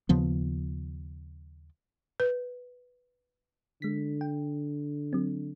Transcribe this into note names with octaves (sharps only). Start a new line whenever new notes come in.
D#2 C#3 F3 B3
B4
D3 G#3 B6
G5
F#3 C4